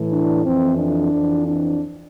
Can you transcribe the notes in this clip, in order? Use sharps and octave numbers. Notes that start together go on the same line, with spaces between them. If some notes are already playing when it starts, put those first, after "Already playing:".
Already playing: A2 E3
D4
F2 E3 C4
D4
F2 E3
D4